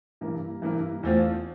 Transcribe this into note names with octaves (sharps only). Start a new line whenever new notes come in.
G2 E3 A#3 E4 A#4
G2 E3 A#3 E4 A#4
E2 E3 A3 C4 F4